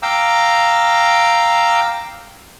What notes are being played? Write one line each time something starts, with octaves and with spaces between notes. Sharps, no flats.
F5 G5 A#5 D6 E6